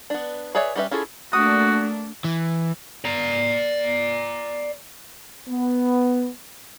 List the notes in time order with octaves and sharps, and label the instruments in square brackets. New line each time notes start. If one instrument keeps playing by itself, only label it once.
[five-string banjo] B3 D4
G#4 B4 C#5 D5 E5
G3 C#4 G4 B4 E5
C#4 E4 F4 G#4 A4
[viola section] A3 A#3 D4 [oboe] F#4 [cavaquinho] D#6
[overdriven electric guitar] E3
[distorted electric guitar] D5 A#5
[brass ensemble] B3